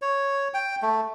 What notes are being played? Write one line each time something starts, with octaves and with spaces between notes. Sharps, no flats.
C#5
G5
A3